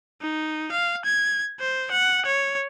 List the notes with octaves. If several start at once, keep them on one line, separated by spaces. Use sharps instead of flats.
D#4
F5
G#6
C5
F#5
C#5